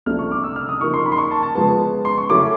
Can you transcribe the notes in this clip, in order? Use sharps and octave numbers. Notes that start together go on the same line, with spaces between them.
C2 C3 F3 A3 D4 F6
C#6
D6
E6
F6
D#6
C#3 F3 A#3 D#4 C#6
C6
B5
C6
C#6
A5
A5
C#3 F3 G#3 B3 A5
C6
C#6
C#3 F#3 A3 C#4 E4 D6